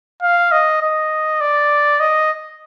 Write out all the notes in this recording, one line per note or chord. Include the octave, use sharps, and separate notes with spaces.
F5
D#5
D#5
D5
D#5